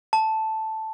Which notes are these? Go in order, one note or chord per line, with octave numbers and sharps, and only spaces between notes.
A5